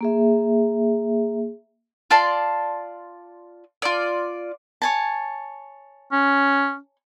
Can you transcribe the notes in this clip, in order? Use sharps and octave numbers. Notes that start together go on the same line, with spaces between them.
A#3 G#4 E5
F4 D5 A5 C6
F4 D5
C#5 G#5 A5
C#4